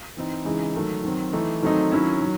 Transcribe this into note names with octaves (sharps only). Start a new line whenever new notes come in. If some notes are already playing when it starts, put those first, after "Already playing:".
E3 C4 D#4
C#3 E3 G#3 D#4
D#3 F#3 A3
D#3 F#3 C4
E3 A3 D#4
D#3 F#3 A3 C4 D#4
D#3 F#3 C#4 E4
D#3 F#3